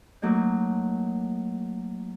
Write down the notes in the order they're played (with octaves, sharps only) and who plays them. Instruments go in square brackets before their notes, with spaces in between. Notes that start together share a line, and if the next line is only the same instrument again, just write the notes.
[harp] F#3 A3 A#3 D#4